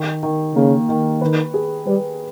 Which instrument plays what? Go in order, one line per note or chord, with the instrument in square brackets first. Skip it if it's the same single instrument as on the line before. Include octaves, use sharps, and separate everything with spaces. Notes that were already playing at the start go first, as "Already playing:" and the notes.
Already playing: [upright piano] D#3
D#3
[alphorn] C#3 [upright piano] A#3
[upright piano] D#3
[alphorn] D#3 [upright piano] B4
[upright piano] G#4
[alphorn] G3 [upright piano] B4